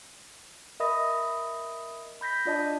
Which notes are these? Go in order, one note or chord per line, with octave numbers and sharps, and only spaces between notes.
A#4 D#5 E5 B5 D#6 A#6
B5 G6 A#6 B6
D4 F4 D5 D#5 A5